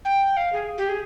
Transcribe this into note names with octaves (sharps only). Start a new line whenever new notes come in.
G5
F5
G#4
G4
G#4